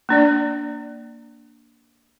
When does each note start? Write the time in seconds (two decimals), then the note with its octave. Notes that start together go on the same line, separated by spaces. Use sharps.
0.09 A#3 D4 D5